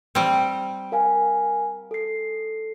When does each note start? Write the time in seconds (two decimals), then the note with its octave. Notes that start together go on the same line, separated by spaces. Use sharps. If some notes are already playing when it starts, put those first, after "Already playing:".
0.15 G3 C4
0.92 A#4 F5 G#5
1.91 A4 C7